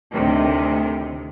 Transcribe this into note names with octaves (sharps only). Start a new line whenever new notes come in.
D2 A2 C3 D#3